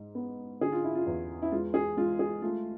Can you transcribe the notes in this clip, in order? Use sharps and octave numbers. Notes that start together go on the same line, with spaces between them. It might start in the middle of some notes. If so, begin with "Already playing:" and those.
Already playing: G#2
B3
D3 G#4
F4
E4
F4
E2
E4
G#3 F4
G#4
G#3 F4
G#4
A3 F4